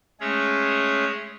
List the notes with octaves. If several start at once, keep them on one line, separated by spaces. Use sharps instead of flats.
G#3 A3 C#4 G#4 C#5